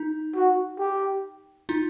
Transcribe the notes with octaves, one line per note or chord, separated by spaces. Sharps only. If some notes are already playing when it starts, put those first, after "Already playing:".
Already playing: D#4
F#4
G4
D#4 F4